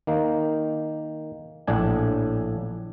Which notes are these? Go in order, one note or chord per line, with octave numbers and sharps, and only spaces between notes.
D#3 A#3
A#1 A2 D4 G#5